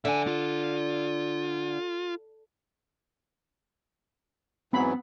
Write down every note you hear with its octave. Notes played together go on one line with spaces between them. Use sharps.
D3 E5 G#5
F4
G#2 E3 F#3 B3 C4 F#5 B5